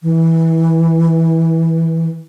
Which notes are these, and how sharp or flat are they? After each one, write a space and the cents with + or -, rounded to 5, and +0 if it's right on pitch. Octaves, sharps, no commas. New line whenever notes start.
E3 -15